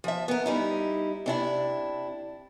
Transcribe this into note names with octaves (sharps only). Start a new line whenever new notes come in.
F3 E5
B3 A#4
G3 D#4 E4
C3 D4 E4